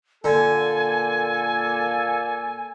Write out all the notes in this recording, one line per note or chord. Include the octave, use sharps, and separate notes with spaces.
A#2 D3 A#3 A4 G#5